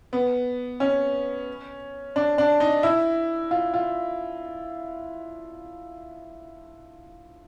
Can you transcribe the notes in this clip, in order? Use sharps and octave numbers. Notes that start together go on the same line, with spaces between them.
B3
C#4
D4
D4
D#4
E4
F4
F4